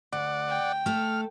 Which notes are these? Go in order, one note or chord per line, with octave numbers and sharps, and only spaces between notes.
D2 D5 F#5
G5
A3 A4 F6